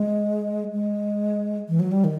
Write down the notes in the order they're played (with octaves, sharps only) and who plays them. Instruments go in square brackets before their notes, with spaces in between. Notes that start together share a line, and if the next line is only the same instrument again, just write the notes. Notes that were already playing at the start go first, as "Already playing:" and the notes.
Already playing: [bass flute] G#3
G#3
E3
F#3
G3
D#3